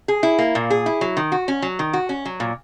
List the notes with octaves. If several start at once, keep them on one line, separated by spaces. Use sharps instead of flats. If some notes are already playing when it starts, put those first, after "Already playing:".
G#4
E4
A#3
A#2
G#4
E4
F#3
D#3
F#4
C#4
F#3
D#3
F#4
C#4
F#3
A#2